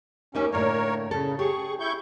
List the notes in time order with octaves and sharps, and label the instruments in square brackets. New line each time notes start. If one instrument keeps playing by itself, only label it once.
[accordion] D#2 C#4 [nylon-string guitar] A#3 D#4 E5
[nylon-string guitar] A2 D3 A#3 [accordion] A#4 C#5
[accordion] C#3 [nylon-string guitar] A4
[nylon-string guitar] G4 [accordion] G#4 C#6
[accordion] E4 C#6 G6